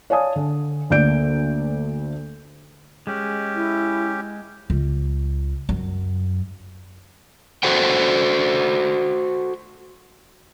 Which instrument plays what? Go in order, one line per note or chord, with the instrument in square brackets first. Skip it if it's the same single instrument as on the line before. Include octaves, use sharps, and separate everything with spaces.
[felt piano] C#5 D5 F5 G#5 A5 D#6
D3
D2 D3 A#3 D5 G6 D7
[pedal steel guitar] G#3 [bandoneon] C#4 G4
[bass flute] E4
[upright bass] C#2
F#2
[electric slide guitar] F#4 A4 C5 F#5 G5